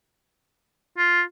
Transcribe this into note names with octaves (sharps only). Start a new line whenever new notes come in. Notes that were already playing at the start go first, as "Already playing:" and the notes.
F4